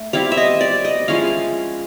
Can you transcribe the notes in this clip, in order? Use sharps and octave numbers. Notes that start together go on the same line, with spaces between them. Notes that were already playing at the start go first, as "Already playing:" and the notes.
Already playing: A3
G3 C4 E4 F5
E5
D#5
D5
D#5
F3 G#3 C#4 E4 F5